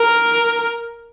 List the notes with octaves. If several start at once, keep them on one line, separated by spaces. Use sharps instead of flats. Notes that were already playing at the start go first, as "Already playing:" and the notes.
Already playing: A#4